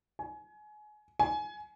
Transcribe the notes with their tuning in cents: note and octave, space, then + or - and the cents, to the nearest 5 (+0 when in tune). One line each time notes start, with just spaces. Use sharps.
G#5 +25
G#5 +20